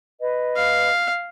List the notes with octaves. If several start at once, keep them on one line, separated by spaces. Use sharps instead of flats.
B4 D#5
F5